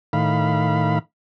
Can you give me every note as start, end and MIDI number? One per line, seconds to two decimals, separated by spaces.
0.13 0.99 45
0.13 0.99 51
0.13 0.99 77
0.13 0.99 83